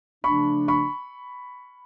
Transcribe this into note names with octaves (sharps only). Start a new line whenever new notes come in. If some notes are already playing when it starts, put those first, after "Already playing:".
C#3 F3 A3 D4 B5 C#6
B5 C#6